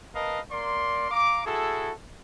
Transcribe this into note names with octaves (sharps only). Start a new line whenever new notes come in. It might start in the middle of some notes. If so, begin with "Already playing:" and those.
A#4 B4 D#5 F5 A5
A#3 A#4 D5 C6
F5 A#5 D6
E4 F#4 G#4 A4